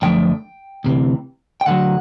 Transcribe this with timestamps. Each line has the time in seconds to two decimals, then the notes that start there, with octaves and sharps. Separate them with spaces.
0.02 F#2 D3 F3 A3 G5
0.84 D2 C3 E3
1.61 G5
1.66 D2 D3 F#3 F#5